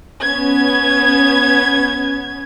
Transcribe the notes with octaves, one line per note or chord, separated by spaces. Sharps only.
B3 C#4 G#6